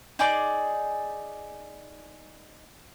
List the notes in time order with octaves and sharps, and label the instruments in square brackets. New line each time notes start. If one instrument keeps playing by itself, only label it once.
[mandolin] D#4 G#4 D5 D6